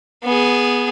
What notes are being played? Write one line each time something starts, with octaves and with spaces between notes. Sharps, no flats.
B3 G#4